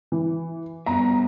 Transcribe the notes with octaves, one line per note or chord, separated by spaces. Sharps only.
E3
G2 B3 E5 A#5